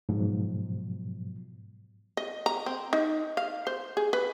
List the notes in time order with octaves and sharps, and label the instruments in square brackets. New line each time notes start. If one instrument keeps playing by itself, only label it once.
[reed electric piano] G#2 B2 F3 F#3
[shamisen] D#5
A#5
C4
D#4
F5
C5
G#4
B4